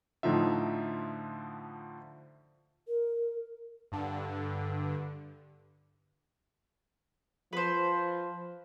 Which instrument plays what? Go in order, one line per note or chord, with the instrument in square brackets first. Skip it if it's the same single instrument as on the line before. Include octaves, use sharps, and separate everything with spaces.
[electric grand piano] A2 D3 F3 D#4 F4 E5
[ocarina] A#4
[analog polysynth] G2 D3
[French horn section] F3 [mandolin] B4 C5